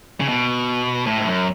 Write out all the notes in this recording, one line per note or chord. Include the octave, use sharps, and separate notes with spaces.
C#3
B2
A2
G#2
F#2